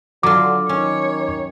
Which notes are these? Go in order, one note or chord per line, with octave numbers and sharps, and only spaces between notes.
D3 F#3 F4 D6
D#3 C#4 C#5